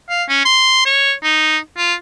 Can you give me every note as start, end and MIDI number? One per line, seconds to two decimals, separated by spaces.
0.09 0.24 77
0.29 0.44 61
0.45 0.81 84
0.85 1.12 73
1.23 1.58 63
1.77 1.94 65